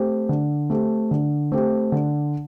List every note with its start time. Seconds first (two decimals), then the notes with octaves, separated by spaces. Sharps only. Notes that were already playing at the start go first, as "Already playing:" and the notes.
Already playing: A3 C4 G4
0.29 D3
0.70 A3 C4 G4
1.11 D3
1.52 A3 C4 G4
1.92 D3